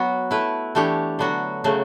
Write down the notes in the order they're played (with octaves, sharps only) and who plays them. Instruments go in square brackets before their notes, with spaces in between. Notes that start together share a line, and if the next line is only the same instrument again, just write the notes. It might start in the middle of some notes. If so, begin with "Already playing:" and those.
Already playing: [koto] F#3 B3 F#4
A3 E4 B4
E3 A3 D4 G4 C#5
D3 F#3 B3 F#4
C#3 F#3 A3